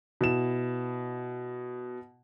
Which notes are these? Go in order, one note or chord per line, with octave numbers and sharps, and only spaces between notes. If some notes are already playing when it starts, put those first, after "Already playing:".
B2 E4 E7